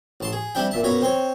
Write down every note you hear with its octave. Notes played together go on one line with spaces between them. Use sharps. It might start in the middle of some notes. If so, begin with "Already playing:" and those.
A1 A5 C6
G#4
G3 C4 D4 E4 G5
A#2 E5 A5
F#2 B2 C#5 A#5 B5
C4 C5 C#5